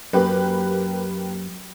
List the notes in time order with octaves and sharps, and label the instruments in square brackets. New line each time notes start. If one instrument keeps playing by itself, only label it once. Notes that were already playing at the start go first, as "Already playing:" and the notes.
[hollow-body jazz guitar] F#2 [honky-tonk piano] A#3 G4 B4